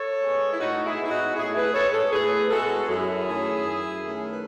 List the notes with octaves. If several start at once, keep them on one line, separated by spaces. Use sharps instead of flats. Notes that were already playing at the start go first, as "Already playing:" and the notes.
Already playing: A4 C#5
G#3 B3
E4
A2 D#4 F#4
E4 G#4
G#3 B3
E4
D#4 F#4
A2 E4 G#4
G#4 B4
G#3 B3 A4 C#5
A4 C#5
A2 G#4 B4
G#3 B3 F#4 A4
F#2 E4 G#4
D#3 A3 C#4
F#2
D#3 A3 C#4
B4